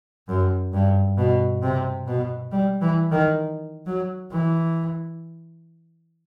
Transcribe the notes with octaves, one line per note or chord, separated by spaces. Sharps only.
F#2
G2
B2
C3
B2
G3
E3
D#3
F#3
E3